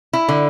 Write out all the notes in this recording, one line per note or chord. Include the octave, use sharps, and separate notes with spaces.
E4
D3